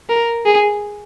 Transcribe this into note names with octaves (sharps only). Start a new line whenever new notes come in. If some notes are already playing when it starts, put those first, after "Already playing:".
A#4
G#4